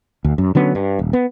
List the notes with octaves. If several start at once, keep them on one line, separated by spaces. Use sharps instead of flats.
D2
F#2
D3 F#3 B3 C#4
G2
D#1
B3